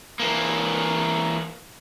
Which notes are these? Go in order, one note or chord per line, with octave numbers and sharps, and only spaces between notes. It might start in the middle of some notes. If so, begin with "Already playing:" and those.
E3 A#3